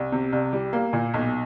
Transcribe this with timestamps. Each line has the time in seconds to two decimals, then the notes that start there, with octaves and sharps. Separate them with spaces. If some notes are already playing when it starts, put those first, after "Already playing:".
Already playing: C2
0.12 C3
0.33 C2
0.53 G3
0.73 A#3
0.93 A#2
1.14 B1